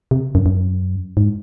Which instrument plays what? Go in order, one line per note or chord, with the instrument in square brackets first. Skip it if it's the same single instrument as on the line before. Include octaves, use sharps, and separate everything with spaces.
[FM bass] C3
F#2
F#2
G#2